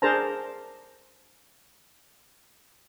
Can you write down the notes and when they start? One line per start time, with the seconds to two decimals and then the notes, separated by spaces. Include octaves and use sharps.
0.02 D4 G#4 A#4 C5 A5 A#5